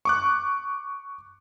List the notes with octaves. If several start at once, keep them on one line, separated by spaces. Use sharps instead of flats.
C#6 D6 F#6